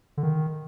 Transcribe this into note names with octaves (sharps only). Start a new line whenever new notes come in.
D3
D#3